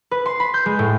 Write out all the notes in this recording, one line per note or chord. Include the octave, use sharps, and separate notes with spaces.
B4
C6
B5
G6
G#3
A2